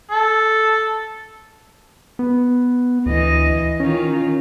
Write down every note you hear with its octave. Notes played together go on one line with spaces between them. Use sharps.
A4
B3
D2 E3 D#5
D#3 C#4 F4